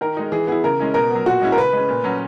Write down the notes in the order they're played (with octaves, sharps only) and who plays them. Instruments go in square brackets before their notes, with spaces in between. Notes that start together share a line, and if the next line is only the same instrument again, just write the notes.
[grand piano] D#3 [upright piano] A#4
[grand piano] G#3 D#4
[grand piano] E3 [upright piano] G#4
[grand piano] B3 E4 [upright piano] G#4
[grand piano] C#3 [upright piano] A#4
[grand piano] G#3 C#4 E4
[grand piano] B2 [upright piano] A#4
[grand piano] F#3 B3
[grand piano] A#2 [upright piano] F#4
[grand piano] G#3 C#4 E4
[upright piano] A#4
[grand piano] C#3 [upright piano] B4
[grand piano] G#3 C#4
A#2
F#3 C#4